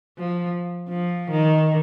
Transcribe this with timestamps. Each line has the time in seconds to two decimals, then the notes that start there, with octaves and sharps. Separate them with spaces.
0.18 F3
0.88 F3
1.31 D#3